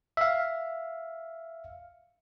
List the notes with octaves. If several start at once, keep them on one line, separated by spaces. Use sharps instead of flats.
E5 F5